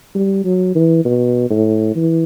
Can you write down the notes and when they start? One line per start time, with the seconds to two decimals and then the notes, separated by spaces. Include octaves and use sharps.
0.15 G3
0.44 F#3
0.75 E3
1.05 B2
1.50 A2
1.95 E3